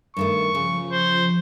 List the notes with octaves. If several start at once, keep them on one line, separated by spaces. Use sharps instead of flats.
G2 D#3 A3 C#6
C#3 F3
C5